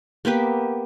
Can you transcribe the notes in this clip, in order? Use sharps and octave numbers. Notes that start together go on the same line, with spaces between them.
A#3 B3 G4 B4